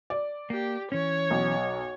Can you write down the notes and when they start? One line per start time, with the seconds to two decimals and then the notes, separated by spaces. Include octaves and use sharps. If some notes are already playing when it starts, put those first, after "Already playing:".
0.10 D5
0.50 A#3 G4
0.92 E3 C#4 C#5
1.31 B1